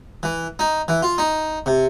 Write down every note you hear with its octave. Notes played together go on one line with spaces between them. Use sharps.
E3
D#4
E3
F4
D#4
C3